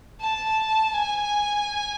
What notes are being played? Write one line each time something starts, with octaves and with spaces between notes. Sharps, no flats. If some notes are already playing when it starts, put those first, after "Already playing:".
A5
G#5